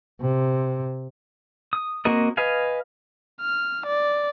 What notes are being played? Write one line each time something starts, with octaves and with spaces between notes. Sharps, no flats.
C3
D#6
A#3 C4 F#4 A#4 D#5
B4 D#5 F5 G#5
F6
D5